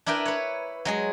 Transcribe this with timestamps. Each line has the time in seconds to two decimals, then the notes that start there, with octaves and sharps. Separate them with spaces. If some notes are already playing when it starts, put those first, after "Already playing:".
0.06 D4 E4 A#4 B4 G5
0.26 B4 C#5
0.85 F#3 G#3 G#4